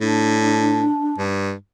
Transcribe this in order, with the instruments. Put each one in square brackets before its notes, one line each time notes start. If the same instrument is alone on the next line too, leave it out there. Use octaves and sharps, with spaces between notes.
[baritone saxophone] A2 [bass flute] D4
[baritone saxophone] G2